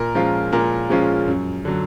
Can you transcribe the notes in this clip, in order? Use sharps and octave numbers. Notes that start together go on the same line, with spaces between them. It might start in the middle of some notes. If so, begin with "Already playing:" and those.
Already playing: A#2 A#4
F3 G#3 C#4 F4
A#2 A#4
F3 G#3 C#4 F4
F#2
D3 F#3